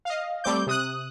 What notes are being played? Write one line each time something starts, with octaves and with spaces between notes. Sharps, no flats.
D#5 F5
G3 A3 C4 D6 G6
C3 D#6 F#6